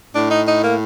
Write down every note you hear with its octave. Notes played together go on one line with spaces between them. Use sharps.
A2 D4
D#4
D#4
A#3